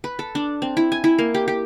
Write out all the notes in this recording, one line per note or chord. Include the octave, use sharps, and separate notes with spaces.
B4
A4
D4
C4
E4
G#5
E4
A#3
G4
G4